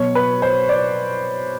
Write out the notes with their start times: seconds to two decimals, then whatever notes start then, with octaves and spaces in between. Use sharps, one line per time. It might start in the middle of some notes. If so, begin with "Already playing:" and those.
Already playing: B2 F#3 C#5
0.15 B4
0.42 C5
0.69 D5